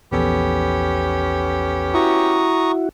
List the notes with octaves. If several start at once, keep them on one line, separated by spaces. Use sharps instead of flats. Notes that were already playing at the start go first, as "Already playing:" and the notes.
A#1 E2 B3 C#4 G4 A4
E4 F#4 A#5 C#6 D#6